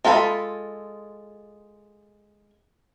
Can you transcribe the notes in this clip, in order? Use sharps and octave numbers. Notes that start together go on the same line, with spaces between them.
G#3 F4 A4 A#5 B5